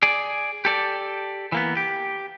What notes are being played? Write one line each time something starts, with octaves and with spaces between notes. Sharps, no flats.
G#4 D5
G4 A4 D5
E3 A#3 B3
G4